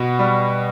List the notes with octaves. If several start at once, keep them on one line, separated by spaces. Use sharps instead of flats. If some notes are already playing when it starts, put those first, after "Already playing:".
Already playing: B2 B3 F#4
G3